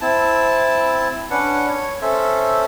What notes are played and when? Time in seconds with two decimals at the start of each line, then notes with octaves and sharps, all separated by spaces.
0.01 C4 E4 A5
1.31 C#4 D4 B4 F#5
1.69 C#5
2.02 C#4 A4 C5 E5